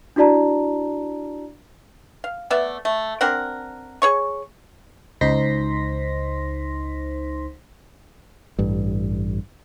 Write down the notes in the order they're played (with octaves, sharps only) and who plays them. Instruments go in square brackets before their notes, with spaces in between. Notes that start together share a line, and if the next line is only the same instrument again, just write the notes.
[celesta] D4 E4 F#4 D5 A5 A#5
[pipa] F5
A3 B3 D5 E5
A3
C4 D4 A#4 F#5
G#4 C#5 C#6
[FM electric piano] C#2 D#4 C5 C6 A#6 B6
[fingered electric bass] A1 G2